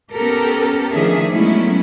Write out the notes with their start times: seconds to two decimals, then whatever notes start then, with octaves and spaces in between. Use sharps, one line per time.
0.10 B3 C#4 G4 A4 A#4
0.92 D#3 F3 A3 D4 G#4 E5
1.29 F#3 G#3 A3 B3 C#4 E4